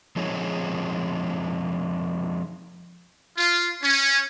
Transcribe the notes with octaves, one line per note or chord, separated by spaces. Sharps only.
F3 G#3 C4 D#4 G#4 C#5
F4
C#4